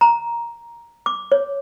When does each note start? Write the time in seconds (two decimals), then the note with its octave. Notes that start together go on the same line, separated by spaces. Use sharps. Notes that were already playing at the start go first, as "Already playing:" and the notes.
0.01 A#5
1.06 D6
1.32 C#5